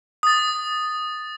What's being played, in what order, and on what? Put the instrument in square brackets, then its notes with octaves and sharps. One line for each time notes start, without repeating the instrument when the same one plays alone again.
[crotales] D#6 A6